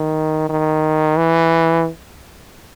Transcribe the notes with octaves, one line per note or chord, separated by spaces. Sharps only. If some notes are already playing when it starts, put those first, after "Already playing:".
Already playing: D#3
D#3
E3